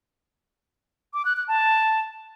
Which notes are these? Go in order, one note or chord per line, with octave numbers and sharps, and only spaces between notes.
D6
F#6
F#6
A5